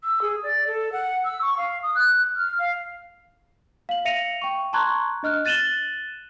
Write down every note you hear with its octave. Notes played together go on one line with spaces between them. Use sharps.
E6
G#4
D5
A4
F#5
E6
C#6
F5
D#6
F#6
F6
F5
F5 F#7
E5 F5 A#6 C#7 D#7 F7
G5 C#6
A5 A#5 C6 C#6 F#6 G#6
D4 D#5 F6 F#6
F#6 A6 D#7 E7 F#7 G7